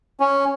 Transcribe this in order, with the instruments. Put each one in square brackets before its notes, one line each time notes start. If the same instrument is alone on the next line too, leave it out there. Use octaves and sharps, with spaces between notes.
[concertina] C#4